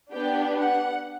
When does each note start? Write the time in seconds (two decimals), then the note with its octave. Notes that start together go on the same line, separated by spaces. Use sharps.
0.12 B3 D4 G4 G5
0.58 F#5